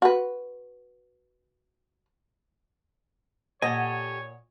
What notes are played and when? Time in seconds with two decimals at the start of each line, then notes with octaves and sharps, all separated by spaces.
0.02 F#4 B4
3.62 A#2 G4 A4 C#5 D#5 F#5 G#5